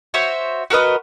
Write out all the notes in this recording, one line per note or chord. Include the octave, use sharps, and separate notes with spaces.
F#4 C5 C#5 E5
F#4 A#4 B4 D#5